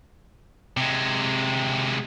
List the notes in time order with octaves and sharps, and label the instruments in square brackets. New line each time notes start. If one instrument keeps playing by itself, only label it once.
[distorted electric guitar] C3 G#3